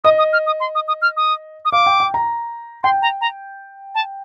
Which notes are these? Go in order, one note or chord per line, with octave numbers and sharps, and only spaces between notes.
D#5 D#6
D#6
F6
D#6
C6
D#6
D#6
F6
D#6
D#6
F5 D6
G5
G5
A#5
G5 C6
A#5
A#5
A5